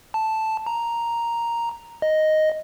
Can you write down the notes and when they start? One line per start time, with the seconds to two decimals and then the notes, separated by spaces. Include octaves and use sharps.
0.14 A5
0.66 A#5
2.02 D#5